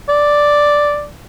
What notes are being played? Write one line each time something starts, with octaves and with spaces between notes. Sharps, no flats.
D5